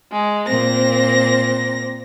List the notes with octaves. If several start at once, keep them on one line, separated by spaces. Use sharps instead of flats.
G#3
A#2 C4 A#6